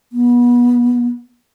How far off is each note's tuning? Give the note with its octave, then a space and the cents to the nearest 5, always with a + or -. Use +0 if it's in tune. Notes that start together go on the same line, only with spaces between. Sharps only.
B3 -30